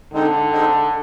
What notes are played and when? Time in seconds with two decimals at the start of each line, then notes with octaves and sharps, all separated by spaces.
0.13 D3 G#3 C4 D#4
0.52 G#3 C4 D#4